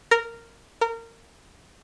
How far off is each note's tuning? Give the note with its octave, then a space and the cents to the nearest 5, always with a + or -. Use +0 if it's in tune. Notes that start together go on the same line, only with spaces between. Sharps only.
A#4 -10
A#4 -25